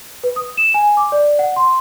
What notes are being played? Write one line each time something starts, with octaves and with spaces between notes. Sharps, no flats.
B4
D#6
E7
G#5
D6
D5
F#5
C6